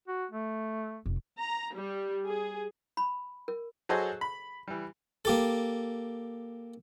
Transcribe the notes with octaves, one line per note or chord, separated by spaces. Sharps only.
F#4
A3
F1
A#5
G3
G#4
B5
A#4
F#3 F#4 G#4 A4 C5 D#5
B5
E3 G3
A#3 G4 A4